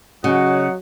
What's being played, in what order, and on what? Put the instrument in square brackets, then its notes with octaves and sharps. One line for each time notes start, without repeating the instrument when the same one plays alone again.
[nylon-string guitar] C#3 [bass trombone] F#3 [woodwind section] F#4 D#5 F#5